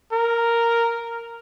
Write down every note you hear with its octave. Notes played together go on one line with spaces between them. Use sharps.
A#4